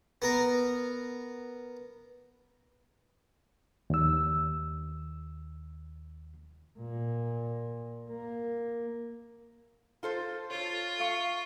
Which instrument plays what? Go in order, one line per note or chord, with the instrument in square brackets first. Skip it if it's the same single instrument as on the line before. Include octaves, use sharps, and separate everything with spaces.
[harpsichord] B3 A#4
[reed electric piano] D#2 E6
[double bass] A#2
A#3
[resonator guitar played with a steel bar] F4 A4 C5
[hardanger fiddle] F4 [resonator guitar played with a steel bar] A4 C#5
[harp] F5 C#6